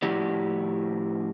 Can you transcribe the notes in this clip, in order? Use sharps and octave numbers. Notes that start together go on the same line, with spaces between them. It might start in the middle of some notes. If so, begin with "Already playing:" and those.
A2 F3 E4 F#4 G4 D5